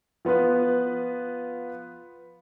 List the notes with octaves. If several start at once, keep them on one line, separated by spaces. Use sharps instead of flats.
F3 B3 F4 B4